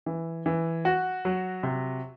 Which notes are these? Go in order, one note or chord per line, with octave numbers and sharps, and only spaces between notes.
E3
E3
F#4
F#3
C3